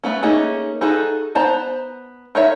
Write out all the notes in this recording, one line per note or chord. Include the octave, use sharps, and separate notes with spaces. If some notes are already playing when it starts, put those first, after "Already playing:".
A3 B3 C#4
A3 A#3 C#4 D#4 G#4
D#4 F#4 G#4 A4
B3 C5 A5 A#5
D#4 A#4 C#5 E5